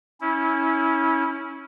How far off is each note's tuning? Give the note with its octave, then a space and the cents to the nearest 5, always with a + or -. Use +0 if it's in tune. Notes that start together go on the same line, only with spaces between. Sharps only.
C#4 +0 E4 -25